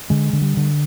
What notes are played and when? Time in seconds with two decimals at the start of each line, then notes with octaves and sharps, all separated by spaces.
0.10 D3 G#3
0.33 D3
0.42 G3
0.57 D3